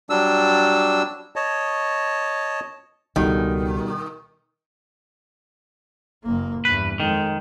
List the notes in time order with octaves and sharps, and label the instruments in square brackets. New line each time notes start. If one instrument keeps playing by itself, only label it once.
[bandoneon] F#3 G3 D4 E6
C#5 D#5 A5
[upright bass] C#2 [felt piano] B2 G3 A4 [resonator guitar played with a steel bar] D#3
[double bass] F#1 A#3
[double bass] E2 G2 [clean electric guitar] B4
[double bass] F2 G#3 [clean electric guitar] D#3